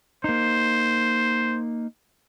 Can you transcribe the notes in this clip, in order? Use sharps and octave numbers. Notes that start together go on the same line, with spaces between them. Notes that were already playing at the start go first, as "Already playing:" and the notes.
A#3 D#4 C5